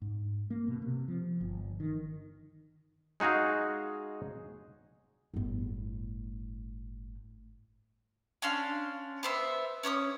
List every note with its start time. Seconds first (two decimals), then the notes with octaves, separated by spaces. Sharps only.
0.02 G#2
0.50 A#3
0.68 B2
0.82 C3
1.08 F3
1.41 G1
1.80 D#3
3.20 G#3 D#4 F#4 G#4 F5
5.34 G1 A2
8.42 C#4 D4 F5 C6
9.23 B3 C5 E5
9.83 C#4 C#5 D6 D#6